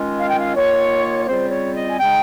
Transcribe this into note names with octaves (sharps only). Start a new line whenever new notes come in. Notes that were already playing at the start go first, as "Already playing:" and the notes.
Already playing: D#3 G#3 C#4 F4
F5
G5
F5
D#3 A#3 F4 C#5
C#5
C#3 G3 C4 F4 C5
C#5
D#5
G#5
C#3 G#3 D#4 G5